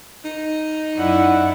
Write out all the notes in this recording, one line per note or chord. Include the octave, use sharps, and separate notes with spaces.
D#4
F#2 E4 D5 F#5